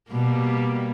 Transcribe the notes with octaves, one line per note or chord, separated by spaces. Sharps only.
B2 G3 A#3